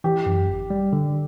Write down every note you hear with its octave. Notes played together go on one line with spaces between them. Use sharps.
E3 G4
F#2
G1
G3
D3